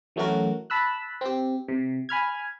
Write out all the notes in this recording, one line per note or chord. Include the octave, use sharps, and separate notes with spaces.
E3 F#3 A3 C#4 F#4 A#4
A5 B5 E6 F#6
C4 G4
C3
G#5 B5 F6 G#6